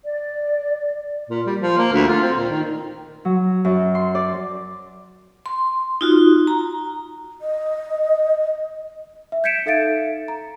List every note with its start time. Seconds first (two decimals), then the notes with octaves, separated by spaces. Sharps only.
0.04 D5
1.30 A#2
1.47 G3
1.61 F3
1.78 A#3
1.93 D2
2.08 F4
2.22 C4
2.38 A#2
2.51 D#3
3.25 F#3
3.65 F#2
3.95 C6
4.15 D5
5.46 C6
6.01 D#4 F4 F#4
6.47 A#5
7.41 D#5
9.32 E5
9.44 G6 G#6 B6 C#7 D7 E7
9.66 D#4 A4 E5 F5 A6 D7
10.28 A#5